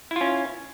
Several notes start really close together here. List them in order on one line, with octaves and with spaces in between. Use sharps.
E4 F4 C#4